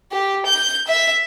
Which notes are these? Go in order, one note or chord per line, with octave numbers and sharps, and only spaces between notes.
G4
G6
E5